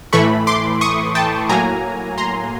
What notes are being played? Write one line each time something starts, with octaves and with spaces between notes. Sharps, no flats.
A2 E3 A3 B5 C#6
C6 D6
C#6 D#6
G5 A5
A2 F#3 A#3 G#5 A#5
A#5 C6